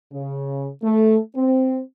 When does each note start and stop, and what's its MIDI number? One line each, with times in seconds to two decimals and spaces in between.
0.12 0.69 49
0.82 1.17 57
1.36 1.80 60